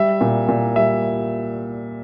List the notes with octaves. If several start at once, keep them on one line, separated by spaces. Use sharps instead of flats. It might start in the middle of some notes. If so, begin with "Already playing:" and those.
Already playing: G3 E5
A#2
A#2
G3 E5